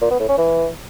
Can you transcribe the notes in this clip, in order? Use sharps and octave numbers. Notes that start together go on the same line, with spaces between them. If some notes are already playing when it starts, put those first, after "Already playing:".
A#2
B3
A2
C#4
E3